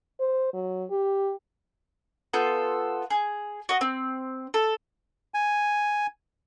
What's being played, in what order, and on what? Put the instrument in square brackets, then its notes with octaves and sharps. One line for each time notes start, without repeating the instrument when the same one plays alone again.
[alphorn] C5
F#3
G4
[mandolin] B3 F4 A4 G6
G#4
F#4 D#5
C4
A4
[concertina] G#5